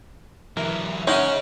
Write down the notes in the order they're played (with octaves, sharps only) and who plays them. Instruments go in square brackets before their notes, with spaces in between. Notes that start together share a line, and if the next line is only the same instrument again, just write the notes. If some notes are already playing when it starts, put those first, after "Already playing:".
[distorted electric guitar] E3 F#3 [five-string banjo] A#4 [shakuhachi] E5
[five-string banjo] G#3 D#4 [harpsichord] C#4 F#5 C6 [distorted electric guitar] G#4 C#5